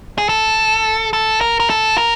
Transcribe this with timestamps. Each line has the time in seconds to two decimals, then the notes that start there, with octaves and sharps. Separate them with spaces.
0.18 G#4
0.29 A4
1.13 A4
1.41 A#4
1.60 A#4
1.70 A4
1.98 A#4